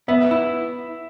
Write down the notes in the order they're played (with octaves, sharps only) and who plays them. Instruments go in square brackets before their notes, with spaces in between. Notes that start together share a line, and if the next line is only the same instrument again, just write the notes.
[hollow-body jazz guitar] B3 [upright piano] E5
[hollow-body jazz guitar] E4